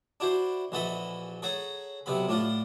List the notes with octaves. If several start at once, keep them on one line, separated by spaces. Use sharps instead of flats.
D4 E4 F#4 C5
A#1 E3 F#4 A4 D#5 B5
G#4 A4 C#5 F#5 A#5
B1 C3 B3 B5
A2 D4 F4 F#5